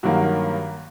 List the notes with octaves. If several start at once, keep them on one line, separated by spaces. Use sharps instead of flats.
G2 D#3 F#3 A#3 F#4